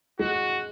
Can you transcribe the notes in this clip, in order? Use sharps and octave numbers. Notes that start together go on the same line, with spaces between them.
G#3 F#4